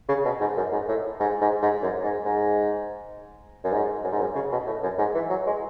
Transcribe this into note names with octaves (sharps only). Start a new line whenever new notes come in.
C#3
B2
G#2
F#2
G#2
A2
G#2
G#2
G#2
F#2
G#2
G#2
F#2
G#2
F#2
G#2
F#2
C#3
B2
A2
F#2
G#2
E3
F#3
G#3